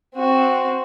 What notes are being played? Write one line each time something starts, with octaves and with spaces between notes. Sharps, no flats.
C4 F#4